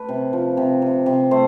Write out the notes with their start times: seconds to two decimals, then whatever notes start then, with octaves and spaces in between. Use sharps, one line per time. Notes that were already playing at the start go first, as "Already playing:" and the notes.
Already playing: A3 B4
0.09 C3
0.33 F3
0.57 C3
0.82 C3
1.06 C3
1.31 A3 C5